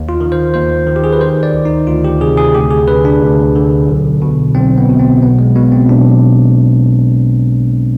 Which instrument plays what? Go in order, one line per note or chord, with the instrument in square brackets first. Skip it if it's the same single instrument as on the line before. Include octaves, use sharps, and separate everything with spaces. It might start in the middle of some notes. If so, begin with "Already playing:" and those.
Already playing: [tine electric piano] D#2
F4
D#3
C5
D#2 C5
D#3
G4
G#4
B4
D#3 C5
D5
D2
D#4
D2 F4
G4
C3 G#4
G#4
D2 G4
G#4
D3 B4
D4
D2
D3
B1
B2
B1 C4
B3
B2
C4
B1 B3
G#3
B2 B3
C4
B1 D4